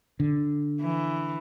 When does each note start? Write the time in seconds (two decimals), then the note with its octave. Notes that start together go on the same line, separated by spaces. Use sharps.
0.20 D3
0.81 E3